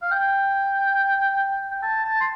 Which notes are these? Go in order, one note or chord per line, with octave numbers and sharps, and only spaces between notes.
F5
G5
G5
A5
A5
C6